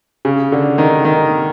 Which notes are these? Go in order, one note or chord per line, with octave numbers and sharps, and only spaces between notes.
C#3
D3
D#3
D#3